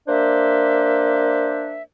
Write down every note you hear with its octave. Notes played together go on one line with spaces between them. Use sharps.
A#3 D4 C5 D5 E5